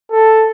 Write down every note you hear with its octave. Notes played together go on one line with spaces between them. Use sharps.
A4